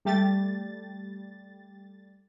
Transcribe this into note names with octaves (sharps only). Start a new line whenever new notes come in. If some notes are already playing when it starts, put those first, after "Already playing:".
G3 A3 G4 A6